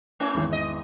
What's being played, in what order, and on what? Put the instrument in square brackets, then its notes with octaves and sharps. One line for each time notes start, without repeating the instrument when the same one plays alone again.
[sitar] A3 C#4 E4
[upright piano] G#1 E2 E3
[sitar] D#5